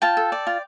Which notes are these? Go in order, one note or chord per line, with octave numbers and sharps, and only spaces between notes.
F4 G5 A5
A4
D5
F4